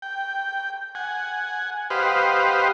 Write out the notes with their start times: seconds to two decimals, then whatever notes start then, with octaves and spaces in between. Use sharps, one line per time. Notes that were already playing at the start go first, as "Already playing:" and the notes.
0.02 G5
0.95 F#5 G#5
1.90 G4 B4 C5 D#5 F5 F#5